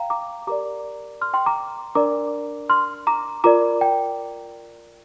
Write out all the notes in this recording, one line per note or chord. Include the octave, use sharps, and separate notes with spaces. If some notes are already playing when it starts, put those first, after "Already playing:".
Already playing: F5 G5 A#5
A#5 D6
G4 A#4 D5 A#5 D6
C6 F6
G5 C6
A#5 D6
D4 A#4 D5 A#5 D6
C6 F6
A#5 D6
F4 A#4 D5 A#5 D6
G5